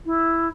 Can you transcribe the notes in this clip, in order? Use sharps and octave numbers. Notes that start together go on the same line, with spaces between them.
E4